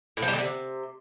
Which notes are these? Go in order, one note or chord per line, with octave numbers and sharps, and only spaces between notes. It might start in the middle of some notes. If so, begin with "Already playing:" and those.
A2
F3
G3
D3
C3